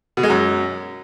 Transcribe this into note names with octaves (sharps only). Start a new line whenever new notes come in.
B2
G#3
F#2